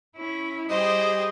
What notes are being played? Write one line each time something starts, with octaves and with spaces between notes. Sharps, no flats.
C#4 E4
G3 G4 G#4 C5 D#5